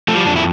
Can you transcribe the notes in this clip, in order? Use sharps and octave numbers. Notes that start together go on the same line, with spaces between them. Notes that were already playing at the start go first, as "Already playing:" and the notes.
F3 A3
G3
F2 D4
E4